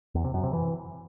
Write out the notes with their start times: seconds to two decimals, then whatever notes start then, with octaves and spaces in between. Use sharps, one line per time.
0.15 E2
0.24 C3
0.34 F#2
0.44 C3
0.53 E3